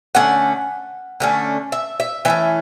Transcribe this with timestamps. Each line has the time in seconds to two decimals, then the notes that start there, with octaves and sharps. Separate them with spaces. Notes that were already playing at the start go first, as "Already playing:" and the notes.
0.15 D3 A3 C#4 F#5
1.20 D3 A3 C#4
1.72 E5
2.00 E5
2.25 E3 A3 C#4 E5